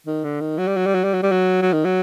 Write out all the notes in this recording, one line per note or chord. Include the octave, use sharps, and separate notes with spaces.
D#3
D3
D#3
F#3
G3
F#3
G3
F#3
G3
F#3
G3
F#3
F#3
D#3
F#3